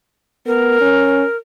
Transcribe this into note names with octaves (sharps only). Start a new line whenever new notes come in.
B3 A#4
C#4